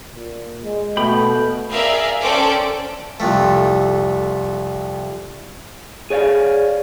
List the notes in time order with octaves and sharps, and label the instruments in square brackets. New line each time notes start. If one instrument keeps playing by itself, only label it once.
[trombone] A#2
G#3
[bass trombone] B2 [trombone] A3 [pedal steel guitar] G5 B5 D#6
[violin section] G#4 A#4 D5 E5 F5
C#4 A4 C5 D5 G5 D6
[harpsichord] C2 F2 A3
[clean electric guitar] G#4 C#5 D5 F5